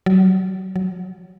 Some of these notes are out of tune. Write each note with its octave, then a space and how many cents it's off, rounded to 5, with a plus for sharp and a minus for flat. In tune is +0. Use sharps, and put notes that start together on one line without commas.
F#3 +30
F#3 -5